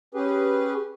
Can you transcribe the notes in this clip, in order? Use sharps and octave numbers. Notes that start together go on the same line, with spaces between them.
C#4 G4 G#4 B4